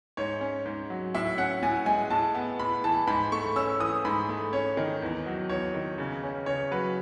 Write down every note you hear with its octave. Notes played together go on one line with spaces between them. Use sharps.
G#2 C#5
C#4
G#2
F#3
A2 E5
C#4 F#5
A2 G#5
G#3 G#5
A2 A5
B3
A2 B5
E3 A5
G#2 B5
A3 C#6
C#4 E6
E3 D#6
G#2 B5
A3
C#4 C#5
D#3
E2
F#3
E2 C#5
D#3
C#3
C#4
C#3 C#5
F#3 B4